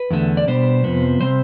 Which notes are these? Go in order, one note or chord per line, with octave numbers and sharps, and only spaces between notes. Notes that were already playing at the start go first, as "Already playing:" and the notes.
Already playing: B4
E2 D3 A3
D5
B2 G3 B3 D4 C5
F2 C3 F3 B3
C3 G3 C4 C5